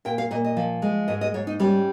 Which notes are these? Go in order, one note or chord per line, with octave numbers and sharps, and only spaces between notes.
A#2 G5
F5
A#2 D#5
D#5
F3
G#3
G#2 D#5
D#5
G#2 C#5
D#4
G3 C#4